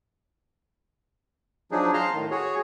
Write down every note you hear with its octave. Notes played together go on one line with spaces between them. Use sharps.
F3 F#3 D4 D#4 G#4
F5 A5 A#5 C6 F6
A2 D#3
F#4 G#4 C#5